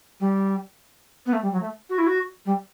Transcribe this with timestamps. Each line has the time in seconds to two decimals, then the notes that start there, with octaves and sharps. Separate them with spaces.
0.20 G3
1.26 B3
1.33 A3
1.42 G3
1.52 F#3
1.61 A3
1.90 F#4
1.98 E4
2.07 F#4
2.46 G3